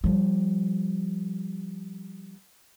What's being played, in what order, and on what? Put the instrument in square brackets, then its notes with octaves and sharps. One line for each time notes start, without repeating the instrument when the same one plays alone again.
[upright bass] F3 G3